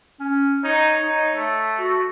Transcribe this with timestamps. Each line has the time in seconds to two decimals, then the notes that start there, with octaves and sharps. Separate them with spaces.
0.20 C#4
0.64 D#4 C#5
1.03 D#4
1.35 A3
1.79 F#4